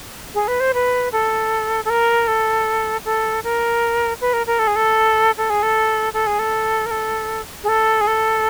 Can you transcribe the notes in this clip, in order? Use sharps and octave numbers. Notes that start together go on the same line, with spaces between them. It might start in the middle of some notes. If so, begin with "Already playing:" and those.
G#4
B4
C5
B4
A4
A4
A#4
A4
A4
A#4
B4
A#4
A#4
A4
G#4
A4
A4
G#4
A4
A4
G#4
A4
A#4
A4
G#4
A4
G#4
A4